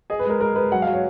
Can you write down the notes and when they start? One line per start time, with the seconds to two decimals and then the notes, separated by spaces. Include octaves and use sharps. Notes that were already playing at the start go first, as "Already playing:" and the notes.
0.10 G#4 D#5
0.19 B4
0.25 G#3 A#4
0.40 G#3 A#4
0.56 G#3 B4
0.72 F#3 F#5
0.82 F5
0.87 F#3
0.93 C#5